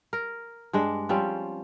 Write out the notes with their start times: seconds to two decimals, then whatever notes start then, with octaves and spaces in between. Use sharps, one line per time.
0.13 A#4
0.73 G2 G#3 D4
1.09 F3 G3 C4 C#4